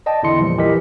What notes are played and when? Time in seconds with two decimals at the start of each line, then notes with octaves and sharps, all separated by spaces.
0.06 D5 D#5 G5 A5
0.23 E2 D3 E4 D#5 C6 C#7
0.40 A#2 E3 F3 G3
0.57 A1 E3 G4 A#4 D#5 B6